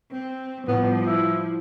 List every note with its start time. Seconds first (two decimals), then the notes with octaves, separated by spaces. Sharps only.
0.11 C4
0.68 A2 F3 G3 B3
1.07 E4